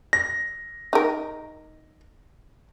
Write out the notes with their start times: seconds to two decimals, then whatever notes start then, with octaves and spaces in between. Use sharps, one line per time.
0.13 A#6
0.93 D#4 A#4